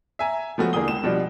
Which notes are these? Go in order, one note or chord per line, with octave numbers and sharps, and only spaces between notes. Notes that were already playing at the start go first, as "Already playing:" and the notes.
E5 G#5 A#5
F3 G#3 A3 B3 C#4 F#4
E2 D3 A#3 G#4 D#6 G7
C#2 E7
B2 F3 G3 D4